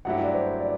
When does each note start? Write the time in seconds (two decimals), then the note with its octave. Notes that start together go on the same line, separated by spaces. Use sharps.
0.05 G2 F#3 A3 E4 G4 F#5
0.23 D5
0.34 C5
0.60 D5